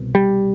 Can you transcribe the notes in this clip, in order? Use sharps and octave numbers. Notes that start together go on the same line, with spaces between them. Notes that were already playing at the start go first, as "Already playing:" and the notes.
Already playing: C2 B2
G3